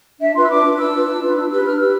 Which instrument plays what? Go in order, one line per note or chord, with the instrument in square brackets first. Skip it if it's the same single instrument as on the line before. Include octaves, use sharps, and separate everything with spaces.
[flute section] D4 E5
F4 B4 C6
E6
D4 D6
F4 B4
D4 E6
F4 B4
D4
F4 B4
D4 E6
G4 B4 E6
D4 F6
G4 B4 E6